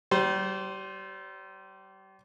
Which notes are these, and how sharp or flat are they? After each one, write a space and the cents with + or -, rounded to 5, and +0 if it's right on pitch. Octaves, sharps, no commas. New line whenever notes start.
G3 -35 C5 +0